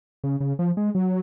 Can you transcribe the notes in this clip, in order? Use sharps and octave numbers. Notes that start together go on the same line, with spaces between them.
C#3
C#3
F3
G#3
F#3